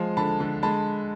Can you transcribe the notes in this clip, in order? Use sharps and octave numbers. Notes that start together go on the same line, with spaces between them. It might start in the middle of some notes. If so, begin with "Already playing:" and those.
Already playing: F3 G#3
D3 A5 B5
D3
G#3 A5 B5